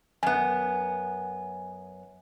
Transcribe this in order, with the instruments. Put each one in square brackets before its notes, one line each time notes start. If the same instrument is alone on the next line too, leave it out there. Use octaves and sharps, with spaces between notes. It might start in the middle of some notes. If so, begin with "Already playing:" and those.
[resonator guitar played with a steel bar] F#2 B3 [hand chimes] G#5